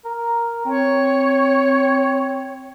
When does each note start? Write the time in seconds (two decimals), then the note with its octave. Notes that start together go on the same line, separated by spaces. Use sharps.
0.05 A#4
0.65 C4 C#5